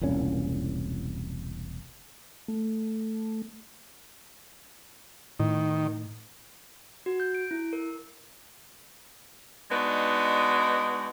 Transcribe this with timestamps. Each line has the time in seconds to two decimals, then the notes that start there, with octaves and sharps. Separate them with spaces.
0.01 E1 C2 A#2 C#4
2.48 A3
5.40 A2 D#3
7.06 F#4
7.20 G6
7.35 D7
7.51 E4
7.73 A#4
9.70 G#3 B3 D4 D#4 F#4